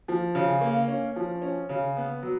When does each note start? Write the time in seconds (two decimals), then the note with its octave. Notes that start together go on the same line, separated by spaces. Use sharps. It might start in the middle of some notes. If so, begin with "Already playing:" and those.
0.08 F3
0.35 C#3
0.61 A#3
0.88 C#4
1.16 F3
1.42 C#4
1.69 C#3
1.97 B3
2.22 F#3